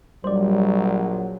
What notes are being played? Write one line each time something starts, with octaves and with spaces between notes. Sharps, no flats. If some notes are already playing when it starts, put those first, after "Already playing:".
A#1 F#3 G3 C5 D5